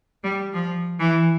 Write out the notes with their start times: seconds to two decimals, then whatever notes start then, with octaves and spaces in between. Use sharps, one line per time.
0.23 G3
0.53 F3
1.00 E3